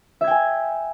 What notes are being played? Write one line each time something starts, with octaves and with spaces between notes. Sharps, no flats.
E5 G5 G#5 G#6